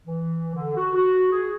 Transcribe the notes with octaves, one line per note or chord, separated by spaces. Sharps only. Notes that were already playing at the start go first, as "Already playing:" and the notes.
E3
D3
F#4
F#4
G#4